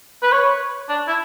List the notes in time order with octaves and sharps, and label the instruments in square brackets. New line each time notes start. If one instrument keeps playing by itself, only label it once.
[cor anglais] B4
C#5
D4
E4